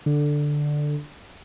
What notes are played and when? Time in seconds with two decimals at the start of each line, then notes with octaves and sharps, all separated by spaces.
0.06 D3